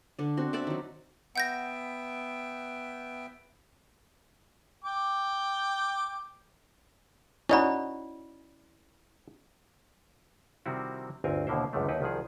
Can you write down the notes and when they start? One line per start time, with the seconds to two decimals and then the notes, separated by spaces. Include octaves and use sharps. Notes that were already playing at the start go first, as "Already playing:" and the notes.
0.19 D3 D4
0.37 C4 F#4
0.53 D5 E5 F#5 D6
0.67 D#3 F#3
1.36 B3 E5 F#5 G5 G6 A#6
4.84 G5 D6
7.49 C#4 D#4 E4 F#4 D5 B5
10.66 C3 D#3 G3 C4 E4 F#4
11.24 G1 D2 C4 A#4 G#5
11.47 D#2 B2 D3 A#3 E4 C5
11.73 C#2 F#2 D3 D#3 A3
11.88 D#2 D#4 E4 B4
12.01 C2 D#3 F3 G#4